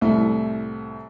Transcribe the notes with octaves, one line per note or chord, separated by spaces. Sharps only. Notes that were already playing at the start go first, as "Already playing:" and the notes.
C2 A2 A3 E4